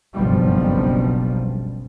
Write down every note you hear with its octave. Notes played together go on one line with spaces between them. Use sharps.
F#1 B1 G2 F3 G3